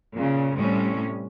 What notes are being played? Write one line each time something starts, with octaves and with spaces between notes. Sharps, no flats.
A#2 C#3
A2 C3 G3 C#4